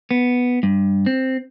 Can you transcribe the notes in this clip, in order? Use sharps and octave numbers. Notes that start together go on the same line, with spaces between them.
B3
G2
C4